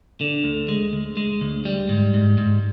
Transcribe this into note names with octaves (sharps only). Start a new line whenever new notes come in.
D3
D2
G#3
D2
G#3
D2
G3
G#2
G#2
G#2